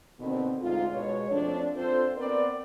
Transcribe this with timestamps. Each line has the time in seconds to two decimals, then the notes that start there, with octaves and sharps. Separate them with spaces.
0.20 B2 D3 D#3 B3 C4
0.62 D2 G#2 D#4 F4
0.94 B2 G#3 B3 C#5
1.31 F2 F3 A3 C4 D4
1.76 C4 D4 F4 A4 C5
2.17 B3 C4 A#4 B4 D5